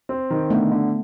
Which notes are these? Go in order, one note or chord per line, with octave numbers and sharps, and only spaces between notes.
C4
D#3
D3 A3 B3
D3